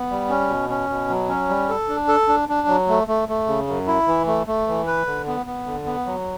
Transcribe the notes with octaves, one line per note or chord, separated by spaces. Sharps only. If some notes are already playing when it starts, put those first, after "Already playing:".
Already playing: B3
G3
C#4
B2
C#4
B2
F#3
C#4
G3
A4
D4
A4
D4
D4
F#3
A3
A3
A3
C#3
F#2
E4
E3
A3
A3
E3
B4
D3
B3
B3
D3
B3
F#3